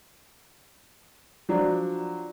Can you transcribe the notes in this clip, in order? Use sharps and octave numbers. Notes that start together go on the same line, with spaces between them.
F3 F#3 D4